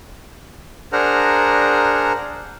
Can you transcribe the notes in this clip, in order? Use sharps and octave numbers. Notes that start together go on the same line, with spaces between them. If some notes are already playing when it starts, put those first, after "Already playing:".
D4 G#4 A#4 C5 F#5 A#5